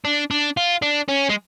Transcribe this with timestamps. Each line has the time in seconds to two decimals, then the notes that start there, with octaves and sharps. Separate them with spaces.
0.05 D4
0.31 D4
0.57 F4
0.82 D4
1.09 C#4
1.30 G#3